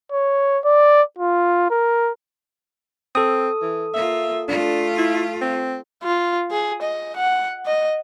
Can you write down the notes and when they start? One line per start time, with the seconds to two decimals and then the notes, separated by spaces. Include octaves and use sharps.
0.12 C#5
0.65 D5
1.18 F4
1.71 A#4
3.15 C4 A4 D#6
3.62 E3
3.94 A#3 F4 E5
4.48 A3 D4 F4
4.98 E4
5.41 C4
6.03 F4
6.51 G#4
6.82 D#5
7.16 F#5
7.66 D#5